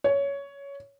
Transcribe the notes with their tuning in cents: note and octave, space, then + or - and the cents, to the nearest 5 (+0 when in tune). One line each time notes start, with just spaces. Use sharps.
C#5 +15